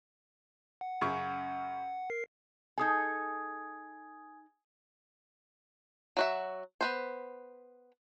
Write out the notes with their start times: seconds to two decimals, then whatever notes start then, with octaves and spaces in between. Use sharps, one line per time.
0.81 F#5
1.01 F#2 C#3 C#6
2.10 A#4 C7
2.78 D#4 G#4 A4 G#5 D#6 G#6
6.17 F#3 F#4 E5
6.81 B3 B4 C5